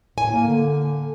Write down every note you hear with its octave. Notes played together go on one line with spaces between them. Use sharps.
A2 G#5
A#3
D3